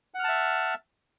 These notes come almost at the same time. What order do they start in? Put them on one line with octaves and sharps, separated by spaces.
F#5 F6 A5 E5